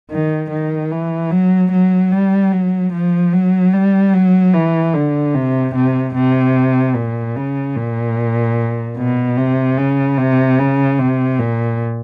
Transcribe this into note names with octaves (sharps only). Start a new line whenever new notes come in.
D#3
D#3
E3
F#3
F#3
G3
F#3
F3
F#3
G3
F#3
E3
D3
C3
C3
C3
A#2
C#3
A#2
B2
C3
C#3
C3
C#3
C3
A#2